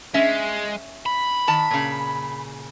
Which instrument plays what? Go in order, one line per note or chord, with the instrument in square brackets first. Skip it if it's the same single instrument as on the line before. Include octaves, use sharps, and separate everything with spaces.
[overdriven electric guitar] G#3 [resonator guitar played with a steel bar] C#4 E5
[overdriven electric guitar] B5
[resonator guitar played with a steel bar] D#3 A5
A#2 C#3